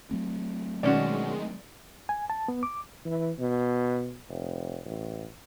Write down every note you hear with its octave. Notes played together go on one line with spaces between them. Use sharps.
F#3 A3 C4
B2 D#3 G#3 C#4 F#4 D5
G#5
A5
B3
D6
E3
B2
F1
A1